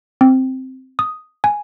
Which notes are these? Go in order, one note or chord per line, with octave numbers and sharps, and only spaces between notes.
C4
D#6
G#5